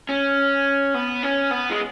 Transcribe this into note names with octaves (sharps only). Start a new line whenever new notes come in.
C#4
B3
C#4
B3
G#3